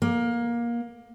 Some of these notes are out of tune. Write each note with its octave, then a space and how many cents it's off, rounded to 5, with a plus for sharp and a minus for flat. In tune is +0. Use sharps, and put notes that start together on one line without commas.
A#3 +20